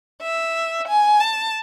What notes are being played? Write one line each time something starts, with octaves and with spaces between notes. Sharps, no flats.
E5
G#5
A5